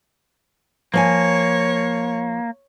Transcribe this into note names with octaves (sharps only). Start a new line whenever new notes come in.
F3 A#3 C#5 G5 G#5